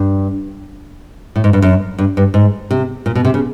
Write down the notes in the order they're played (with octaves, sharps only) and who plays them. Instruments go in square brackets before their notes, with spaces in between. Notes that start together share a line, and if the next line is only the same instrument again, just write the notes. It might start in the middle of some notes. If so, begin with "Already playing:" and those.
Already playing: [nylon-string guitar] G2
A2
G#2
G2
F#2
G2
G2
G#2
C3
A#2
B2
C3
C#3